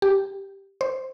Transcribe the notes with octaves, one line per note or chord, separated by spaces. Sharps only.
G4
C5